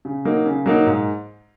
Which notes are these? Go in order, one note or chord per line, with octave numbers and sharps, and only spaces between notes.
C#3
F#3 A#3 D#4
C#3
F#3 A#3 D#4
G#2